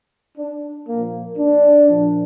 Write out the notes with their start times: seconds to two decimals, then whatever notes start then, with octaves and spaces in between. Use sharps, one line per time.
0.36 D4
0.88 A#2 F3 A#3
1.38 D4
1.89 A#2 F3